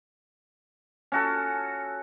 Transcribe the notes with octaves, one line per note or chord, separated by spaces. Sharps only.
C#4 F#4 A4